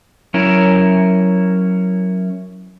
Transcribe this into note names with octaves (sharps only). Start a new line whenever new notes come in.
F#3 C#4 E4 A#4